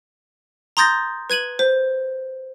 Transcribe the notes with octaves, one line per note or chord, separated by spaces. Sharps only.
A#5 C6 D#6 G6 A6 A#6
B4 G#6 D#7 F#7
C5